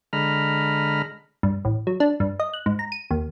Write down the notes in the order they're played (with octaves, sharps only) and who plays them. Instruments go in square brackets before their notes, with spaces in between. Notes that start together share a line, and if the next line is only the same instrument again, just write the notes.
[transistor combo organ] D3 G#3 A#5 B5 F6
[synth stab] G2
A1
F#3
D4
G2
D#5
F#6
G#2
A#5
D#7
D#2